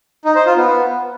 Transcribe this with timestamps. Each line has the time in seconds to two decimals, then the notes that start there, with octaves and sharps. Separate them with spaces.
0.25 D#4
0.36 C5
0.46 F4
0.57 B3